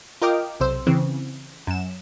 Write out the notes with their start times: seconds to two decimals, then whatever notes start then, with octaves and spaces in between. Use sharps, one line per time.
0.22 F4 A#4 D#5 G5 D6 F6
0.60 B1 C3 C5 E6
0.87 C#3 E3 C4
1.67 F#2 E7